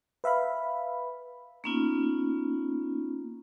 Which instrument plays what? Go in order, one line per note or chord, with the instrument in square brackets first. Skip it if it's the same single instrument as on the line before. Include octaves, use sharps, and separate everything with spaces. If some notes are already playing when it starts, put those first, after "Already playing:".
[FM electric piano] B4 E5 F5 B5
[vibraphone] A#3 B3 C#4 D#4 F4